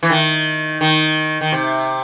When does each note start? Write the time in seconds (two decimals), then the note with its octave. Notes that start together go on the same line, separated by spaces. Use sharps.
0.03 E3
0.10 D#3
0.81 D#3
1.41 D#3
1.52 C3